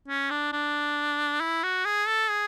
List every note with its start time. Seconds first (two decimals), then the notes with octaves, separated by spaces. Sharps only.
0.08 C#4
0.31 D4
0.53 D4
1.40 E4
1.63 F#4
1.85 G#4
2.07 A4
2.30 G#4